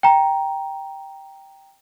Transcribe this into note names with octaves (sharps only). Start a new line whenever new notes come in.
G5 A#5